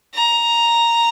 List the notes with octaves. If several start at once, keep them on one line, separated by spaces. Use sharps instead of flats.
A#5